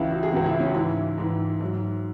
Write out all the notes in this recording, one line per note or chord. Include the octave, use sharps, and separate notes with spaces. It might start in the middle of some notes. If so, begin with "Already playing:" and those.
Already playing: C#2 C#3 E3 E4
F#4
G#4
C#2 C#3 E3 F#4
E4
C#4
F#4
G#2 E3 E4
G#2 E3
G#2 F#3